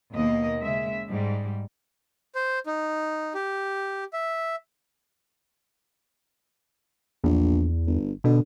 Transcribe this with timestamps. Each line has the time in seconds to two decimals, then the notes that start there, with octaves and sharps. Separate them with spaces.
0.12 D#2 B2 A#3 D#5
0.62 C#3 G#3 E5
1.09 G#2 G3
2.35 C5
2.66 D#4
3.34 G4
4.13 E5
7.24 A#1 E2
7.86 G1
8.24 B2 D3